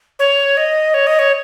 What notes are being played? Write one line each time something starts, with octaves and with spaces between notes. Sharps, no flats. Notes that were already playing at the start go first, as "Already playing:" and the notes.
C#5
D#5
C#5
D#5
C#5